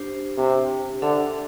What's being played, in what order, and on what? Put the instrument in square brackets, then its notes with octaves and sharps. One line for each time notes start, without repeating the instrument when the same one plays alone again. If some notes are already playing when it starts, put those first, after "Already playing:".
Already playing: [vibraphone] D4 G4 C5
[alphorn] C3
[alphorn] D3 [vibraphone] D4 A4 E5